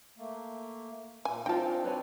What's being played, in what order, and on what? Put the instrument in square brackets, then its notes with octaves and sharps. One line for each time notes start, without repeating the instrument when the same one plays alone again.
[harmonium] A3 A#3
[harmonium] A#2 [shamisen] G#5
[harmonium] C4 D4 [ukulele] D#4 F4 C5 [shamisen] G5 A5
[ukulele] B4 C#5 G#5